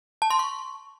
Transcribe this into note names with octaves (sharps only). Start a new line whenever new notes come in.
A5
C6
C#6